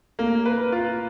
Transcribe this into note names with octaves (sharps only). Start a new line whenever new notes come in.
A#3
B4
F4